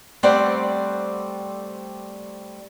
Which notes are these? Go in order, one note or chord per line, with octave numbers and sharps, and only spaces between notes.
G3 A3 C4 C5 D5 F#5